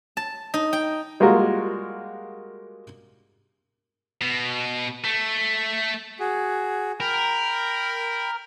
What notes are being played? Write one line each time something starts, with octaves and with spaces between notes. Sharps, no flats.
A5
D#4
G5
G3 G#3 A#3 F4 F#4 A#4
B2
A3
F#4 G#4
A#4 G5 B5